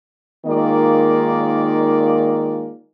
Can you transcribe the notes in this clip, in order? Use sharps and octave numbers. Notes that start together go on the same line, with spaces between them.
D#3 G#3 A#3 D#4 F4 D5